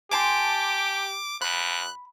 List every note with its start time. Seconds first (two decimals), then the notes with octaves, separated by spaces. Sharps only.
0.11 G4 G#5 A5 C6 D6
1.42 F2 B5 F#6